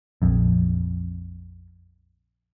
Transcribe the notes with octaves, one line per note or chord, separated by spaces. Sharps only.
A#1 F2